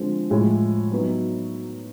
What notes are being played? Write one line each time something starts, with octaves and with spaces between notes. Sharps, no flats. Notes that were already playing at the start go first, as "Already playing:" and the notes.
Already playing: D3 F3 G#3 C4
A2 F3 G#3
F#3 B3 D#4